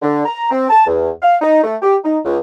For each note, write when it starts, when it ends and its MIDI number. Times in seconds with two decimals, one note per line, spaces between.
0.02 0.24 50
0.26 0.49 82
0.51 0.65 60
0.70 0.84 81
0.87 1.10 40
1.23 1.36 77
1.41 1.61 63
1.63 1.76 57
1.82 1.96 67
2.04 2.18 63
2.25 2.38 37